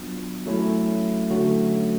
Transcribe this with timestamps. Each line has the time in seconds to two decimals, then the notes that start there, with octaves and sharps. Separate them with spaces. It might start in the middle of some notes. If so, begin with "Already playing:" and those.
Already playing: F#3 B3 D4 F4
0.46 F#3 A3 C#4 E4
1.30 D3 F#3 A3 C#4 F#4